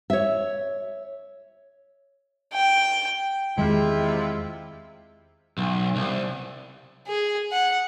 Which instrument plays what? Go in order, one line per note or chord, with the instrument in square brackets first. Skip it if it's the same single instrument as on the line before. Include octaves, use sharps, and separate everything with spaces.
[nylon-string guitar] C#5 E5
[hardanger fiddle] G5
[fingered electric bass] E2 D#3 [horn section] C3 E4 F4 [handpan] G#3
[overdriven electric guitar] B1
C2
[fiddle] G#4
F#5